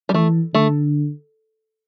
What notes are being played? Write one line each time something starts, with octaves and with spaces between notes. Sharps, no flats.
G3
E3 A3
D3 A3